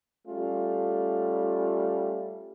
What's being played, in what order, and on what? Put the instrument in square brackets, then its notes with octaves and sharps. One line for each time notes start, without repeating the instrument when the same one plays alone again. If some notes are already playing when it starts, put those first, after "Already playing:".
[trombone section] G3 A3 C#4 F4